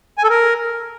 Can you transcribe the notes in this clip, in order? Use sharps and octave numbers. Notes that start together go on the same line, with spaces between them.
G#5
A4
A#4